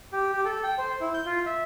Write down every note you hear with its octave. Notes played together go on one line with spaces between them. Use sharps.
G4
G4
A4
G5
C5
E4
G6
F4
E5